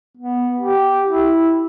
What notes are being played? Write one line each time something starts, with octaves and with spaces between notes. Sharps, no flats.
B3
G4
E4